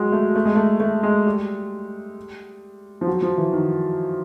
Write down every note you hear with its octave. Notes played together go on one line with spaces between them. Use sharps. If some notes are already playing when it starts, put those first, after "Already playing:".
Already playing: F#3 G#3
A3
A3
G#3
A3
A3
G#3
G3
F3
F#3
F3
E3
D#3